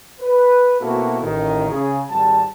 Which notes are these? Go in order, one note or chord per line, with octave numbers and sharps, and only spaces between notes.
B4
B2 A#3 C4 E4 F#4 A4
A1 D#3
C#3 G#4
G#1 G3 F#5 A5